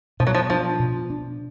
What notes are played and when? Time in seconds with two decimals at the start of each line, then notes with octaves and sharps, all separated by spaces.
0.20 B2 F3
0.27 F#3
0.35 F3
0.50 F3 D4
0.80 B2
1.10 D4